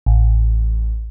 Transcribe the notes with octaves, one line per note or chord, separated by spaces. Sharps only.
A1